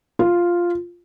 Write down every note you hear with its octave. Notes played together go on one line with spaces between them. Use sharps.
F4